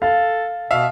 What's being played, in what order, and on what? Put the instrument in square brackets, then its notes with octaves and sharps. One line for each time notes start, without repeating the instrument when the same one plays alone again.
[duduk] A4 [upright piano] F5
[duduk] B2 [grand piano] E5 F5